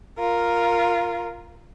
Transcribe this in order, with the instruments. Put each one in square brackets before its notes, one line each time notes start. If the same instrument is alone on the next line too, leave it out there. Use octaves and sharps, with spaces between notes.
[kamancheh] F4 A#4